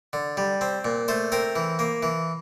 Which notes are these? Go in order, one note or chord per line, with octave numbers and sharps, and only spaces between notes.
D3
G3
C4
A#2
A3 C5
C4 A#4
E3
A#3
E3